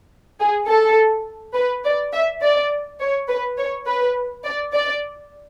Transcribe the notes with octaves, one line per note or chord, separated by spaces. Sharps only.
G#4
A4
B4
D5
E5
D5
C#5
B4
C#5
B4
D5
D5